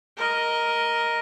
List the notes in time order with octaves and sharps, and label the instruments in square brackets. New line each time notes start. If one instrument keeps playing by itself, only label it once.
[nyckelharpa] A#4 D#5